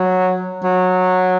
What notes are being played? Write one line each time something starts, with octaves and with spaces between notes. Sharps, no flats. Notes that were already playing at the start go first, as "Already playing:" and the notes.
Already playing: F#3
F#3